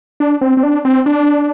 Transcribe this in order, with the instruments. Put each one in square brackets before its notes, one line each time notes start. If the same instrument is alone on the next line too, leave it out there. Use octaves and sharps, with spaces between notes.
[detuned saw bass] D4
C4
C4
D4
C4
D4